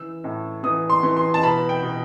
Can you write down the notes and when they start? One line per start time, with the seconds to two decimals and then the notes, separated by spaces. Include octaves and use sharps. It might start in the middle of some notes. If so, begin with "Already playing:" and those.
Already playing: E3 E6
0.24 A2
0.63 E3 D#6
0.90 C6
1.03 E3
1.17 C6
1.34 A5
1.43 B2 B5
1.69 G5
1.83 B2